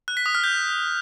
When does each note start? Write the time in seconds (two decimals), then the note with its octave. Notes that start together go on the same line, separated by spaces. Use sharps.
0.08 F#6
0.17 B6
0.26 D#6
0.35 F6
0.44 G6